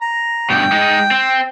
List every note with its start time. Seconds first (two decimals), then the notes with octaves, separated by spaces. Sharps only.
0.02 A#5
0.50 G2 B2 G5
0.72 G#3 D#4
1.11 C4